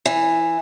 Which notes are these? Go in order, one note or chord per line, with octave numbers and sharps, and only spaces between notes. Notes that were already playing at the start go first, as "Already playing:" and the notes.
E3